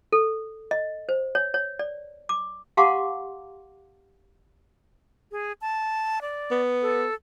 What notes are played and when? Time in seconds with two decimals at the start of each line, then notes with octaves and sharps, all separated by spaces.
0.12 A4
0.71 D#5
1.09 C5
1.35 C#5
1.54 C#5
1.79 D5
2.29 D6
2.77 G4 F5 F#5 A5 C6 D6
5.32 G#4
5.61 A5
6.22 D5
6.51 B3
6.82 A4